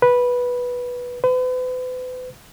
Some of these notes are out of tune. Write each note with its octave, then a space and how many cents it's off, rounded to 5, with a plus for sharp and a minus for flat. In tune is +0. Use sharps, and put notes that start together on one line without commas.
B4 -10
B4 +40